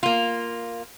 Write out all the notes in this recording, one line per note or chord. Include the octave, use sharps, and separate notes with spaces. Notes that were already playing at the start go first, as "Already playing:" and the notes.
A#3 F4